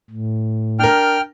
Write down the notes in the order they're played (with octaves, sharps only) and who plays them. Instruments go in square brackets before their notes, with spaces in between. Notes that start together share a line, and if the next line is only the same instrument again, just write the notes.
[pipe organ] A2
[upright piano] D4 A#4 [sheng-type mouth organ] G5 F6